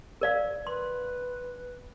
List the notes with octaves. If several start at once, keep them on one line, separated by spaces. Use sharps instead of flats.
A#4 D5 F5
B4 C6